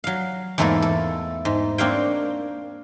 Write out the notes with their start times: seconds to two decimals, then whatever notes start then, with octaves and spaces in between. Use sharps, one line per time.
0.04 F#3 F5
0.58 E2 G#2 A3 A#3 E4 A4
0.82 A4
1.45 G#2
1.78 A#3 C4 D4 C#5 F5 G5